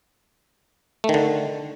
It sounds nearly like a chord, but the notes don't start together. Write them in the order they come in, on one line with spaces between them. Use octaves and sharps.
A3 D#3 D3